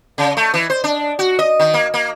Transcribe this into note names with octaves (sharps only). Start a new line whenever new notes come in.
C#3
A3
E3
C5
D4
F#4
D#5
D#3
A#3
A#3